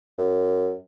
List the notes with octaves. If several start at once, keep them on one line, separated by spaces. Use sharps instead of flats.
F#2